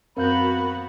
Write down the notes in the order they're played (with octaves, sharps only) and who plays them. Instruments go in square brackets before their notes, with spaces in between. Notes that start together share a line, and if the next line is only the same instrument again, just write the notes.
[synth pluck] F#2 C4 [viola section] B3 F#4 [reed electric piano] A#4 F5 G6 [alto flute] B5